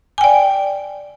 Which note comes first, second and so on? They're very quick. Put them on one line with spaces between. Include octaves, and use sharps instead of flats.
G#5 G5 D5